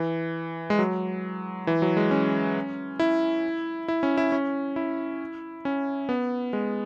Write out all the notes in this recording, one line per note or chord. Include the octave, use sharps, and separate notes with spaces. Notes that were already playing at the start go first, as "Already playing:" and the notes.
Already playing: E3
G#3
F#3
E3
F#3
G#3
C#4
E4
E4
C#4
E4
C#4
E4
C#4
B3
G#3